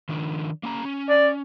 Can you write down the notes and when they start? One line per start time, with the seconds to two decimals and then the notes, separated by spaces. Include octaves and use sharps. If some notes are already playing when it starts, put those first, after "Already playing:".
0.09 D#3 F3 D4
0.63 A#3 C#4 A#5
0.85 C#4
1.09 D5